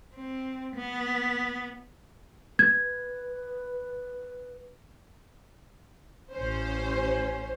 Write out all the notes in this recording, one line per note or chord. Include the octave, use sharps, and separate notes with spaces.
C4
B3
B4 G#6
A1 C#4 C5